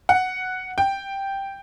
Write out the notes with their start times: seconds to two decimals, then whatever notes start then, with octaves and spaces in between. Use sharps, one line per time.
0.09 F#5
0.78 G5